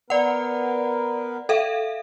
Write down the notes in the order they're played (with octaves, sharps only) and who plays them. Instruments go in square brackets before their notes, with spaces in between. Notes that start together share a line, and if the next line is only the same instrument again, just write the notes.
[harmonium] B3 A#4 B4 [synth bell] D5 F#5
[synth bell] A4 E5 F5